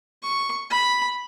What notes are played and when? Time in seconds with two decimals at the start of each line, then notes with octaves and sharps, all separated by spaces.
0.22 C#6
0.70 B5